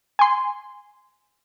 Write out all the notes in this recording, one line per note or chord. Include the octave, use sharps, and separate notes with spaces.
G#5 C6